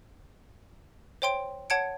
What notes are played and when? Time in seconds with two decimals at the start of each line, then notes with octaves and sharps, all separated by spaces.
1.22 C5 C#5 G5 C6 D7
1.70 C#5 F#5 A5 G#6 C#7 D7